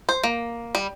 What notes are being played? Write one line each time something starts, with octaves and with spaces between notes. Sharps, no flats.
C5
A#3
G3